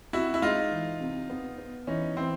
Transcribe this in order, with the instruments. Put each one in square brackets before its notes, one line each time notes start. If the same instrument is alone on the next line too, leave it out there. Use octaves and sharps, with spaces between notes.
[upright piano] C3 [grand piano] E4 F#4
[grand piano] E4
[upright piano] G#3 [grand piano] D#4 F4
[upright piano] E3
C3
B3
B3
[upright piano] E3 [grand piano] C#4 D#4
[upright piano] E3 [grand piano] C4